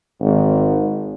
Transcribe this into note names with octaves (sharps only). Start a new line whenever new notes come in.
G#1